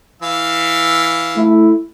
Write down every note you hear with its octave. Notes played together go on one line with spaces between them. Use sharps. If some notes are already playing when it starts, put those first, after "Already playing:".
E3 F5 E6
A3 E4